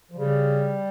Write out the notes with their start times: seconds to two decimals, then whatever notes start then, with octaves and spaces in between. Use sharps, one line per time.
0.12 F3
0.16 C#3 G3